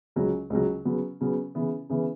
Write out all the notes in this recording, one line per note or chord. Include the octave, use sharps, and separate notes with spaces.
C#2 C#3 F#3
C#2 C#3 F#3
C#3 F#3 B3
C#3 F#3 B3
C#3 E3 B3
C#3 E3 B3